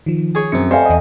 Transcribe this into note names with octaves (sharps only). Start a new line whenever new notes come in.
D#3 F3
G#4 C#5
F#2 C4 C#7
F2 C5 D5 E5 F5 G#5
E2 D#5